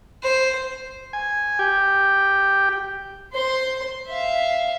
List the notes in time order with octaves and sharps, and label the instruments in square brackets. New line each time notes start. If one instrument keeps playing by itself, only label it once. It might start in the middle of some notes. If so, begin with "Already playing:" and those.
[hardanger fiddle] C5
[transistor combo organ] G#5
G4
[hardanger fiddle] C5 C6
E5 F5